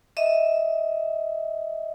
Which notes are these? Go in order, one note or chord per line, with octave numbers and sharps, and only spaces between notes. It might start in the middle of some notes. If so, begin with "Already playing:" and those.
D#5 E5